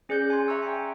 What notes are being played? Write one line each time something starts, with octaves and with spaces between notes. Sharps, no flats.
C#4 G#4 D5 F#6 G6
G#5 C6
E5 A#5 C#6 E6
G5 G#5